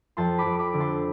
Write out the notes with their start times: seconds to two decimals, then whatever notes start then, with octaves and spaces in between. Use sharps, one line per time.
0.17 F2 A5 C6
0.38 B5 D6
0.45 F2
0.59 B5 D6
0.73 D3
0.80 A5 C6